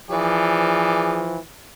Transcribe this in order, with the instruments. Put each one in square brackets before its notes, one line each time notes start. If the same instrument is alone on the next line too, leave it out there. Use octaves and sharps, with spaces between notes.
[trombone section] E3 F3 [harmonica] G#4 D5